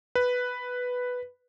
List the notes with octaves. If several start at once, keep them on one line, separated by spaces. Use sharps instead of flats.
B4